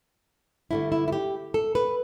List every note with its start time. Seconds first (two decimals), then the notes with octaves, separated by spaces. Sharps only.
0.71 G2 D3 A3 E4
0.92 E4
1.08 E4
1.12 G4
1.54 A4
1.75 B4